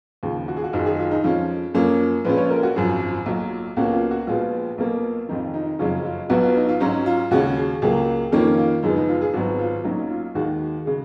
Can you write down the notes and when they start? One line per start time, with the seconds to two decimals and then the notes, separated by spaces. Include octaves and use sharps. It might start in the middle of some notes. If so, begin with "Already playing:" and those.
0.23 D#2 C#3 F3
0.48 F#4
0.57 G#4
0.64 F#4
0.73 F#1 F#2 D#3 F4
0.86 G#4
0.99 F4
1.11 D#4
1.24 F2 F3 G#3 C#4 F4
1.74 F#2 F3 A#3 C#4
2.25 A#1 A#2 F3 G#3 C#4 B4
2.37 C#5
2.50 A#4
2.63 F#4
2.76 G#1 F#2 F3 G#4
3.26 B1 A#2 F#3
3.76 C#2 B2 A#3 C#4 F#4
3.93 F4
4.11 F#4
4.27 A#1 A#2 F3 G#3 B3 F4
4.78 B1 B2 A#3
5.29 F1 F2 D#3 D#4
5.54 D#4
5.79 F#1 F2 C#3 F#3 C#4 F4
6.05 F4
6.30 B1 B2 F#3 B3 F#4
6.43 F4
6.56 D#4
6.69 F4
6.80 G#2 F#3 C#4 D#4
7.06 F4
7.31 D#2 C#3 G#3 C#4 F#4
7.57 G#4
7.82 C#2 C#3 F#3 A#3 G#4
8.32 F2 D#3 A#3 C#4 F4
8.58 F4
8.83 F#2 C#3 F3 G#3 B3 D#4
8.96 D#4
9.09 F4
9.21 G#4
9.34 G#1 G#2 F#3 B3 F#4
9.59 F4
9.84 B1 A#2 F#3 C#4 D#4
10.10 F4
10.35 D#2 D#3 G#3 F#4
10.86 C#3 G#3